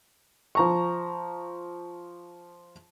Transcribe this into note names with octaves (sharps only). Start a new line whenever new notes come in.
F3 A#5 C#6